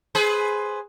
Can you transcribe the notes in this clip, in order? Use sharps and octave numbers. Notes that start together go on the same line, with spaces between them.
G#4 B4 C5